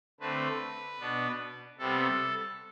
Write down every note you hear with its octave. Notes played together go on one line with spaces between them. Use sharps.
D3 A3 C4 B4
B2 B3 D4
C3 G3 B3 A4